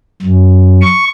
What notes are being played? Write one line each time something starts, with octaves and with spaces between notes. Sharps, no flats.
F#2
C#6